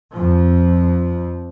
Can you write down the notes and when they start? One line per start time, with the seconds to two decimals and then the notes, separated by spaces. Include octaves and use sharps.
0.13 F2 F3